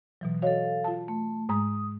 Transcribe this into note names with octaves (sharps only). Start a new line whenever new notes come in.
B2 E3 F#3
F#4 A4 C#5 D#5 F5
F4 A5
A3
G#2 G#3 A#5 D#6